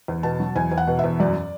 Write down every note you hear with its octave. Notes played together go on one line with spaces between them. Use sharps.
E2
B2 A5
F#3
E2 G#5
E2
F#5
B2
E5
E2
F#2 D5